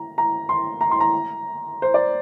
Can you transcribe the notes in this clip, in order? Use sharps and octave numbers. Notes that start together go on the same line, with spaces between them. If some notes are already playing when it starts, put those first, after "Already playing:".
Already playing: A#5
A#5
C6
A#5
C6
A#5
C5
D5